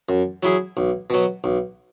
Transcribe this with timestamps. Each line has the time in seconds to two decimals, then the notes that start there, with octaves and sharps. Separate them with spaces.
0.09 F#2
0.43 F#3 E4 G#4
0.77 B1
1.10 B2 F#3
1.44 B1